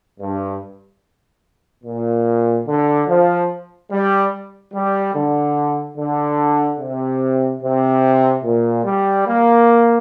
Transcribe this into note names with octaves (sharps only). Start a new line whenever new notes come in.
G2
A#2
D3
F3
G3
G3
D3
D3
C3
C3
A#2
G3
A#3